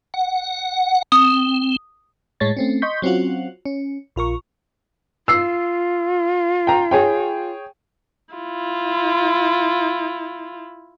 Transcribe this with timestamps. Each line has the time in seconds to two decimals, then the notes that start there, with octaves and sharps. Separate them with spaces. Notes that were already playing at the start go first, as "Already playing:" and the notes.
0.14 F#5
1.12 C4 D#6
2.40 A2 G#3 C#5 A6
2.57 A3 C4 C#4
2.82 D#5 C6 C#6 G6 B6
3.02 F#3 C4 C#4 F4 F#4
3.65 C#4
4.16 A#1 F4 A#4 C#6
5.28 F4 E6 C7
6.67 G5 A#5
6.91 G#4 C#5 G5
8.34 E4 F4